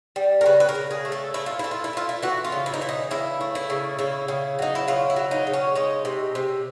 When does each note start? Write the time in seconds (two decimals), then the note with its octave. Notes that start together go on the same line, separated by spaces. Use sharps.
0.16 G3
0.41 A#4
0.46 C#3 B4
0.60 B4
0.69 A#4
0.75 C#3
0.91 G#4
1.05 A3
1.12 A4
1.34 A3 E4
1.46 F4
1.59 A3 E4
1.71 F4
1.84 E4
1.93 A3 F4
2.09 E4
2.22 E3 F#4
2.45 F4
2.52 C#3
2.66 E4
2.74 D#4
2.81 E3 E4
2.89 D#4
3.11 C#3 E4
3.41 A3
3.55 E4
3.70 C#3
3.99 C#3 E4
4.28 C#3
4.59 F#3 D#4
4.75 E4
4.88 C#3 F4
5.10 E4
5.16 F#3
5.31 D#4
5.47 C#3
5.53 C#4
5.75 G#3 D#4
6.05 C3
6.35 C3